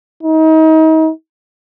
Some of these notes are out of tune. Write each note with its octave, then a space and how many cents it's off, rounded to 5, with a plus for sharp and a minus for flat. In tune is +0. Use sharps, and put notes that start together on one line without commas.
D#4 +35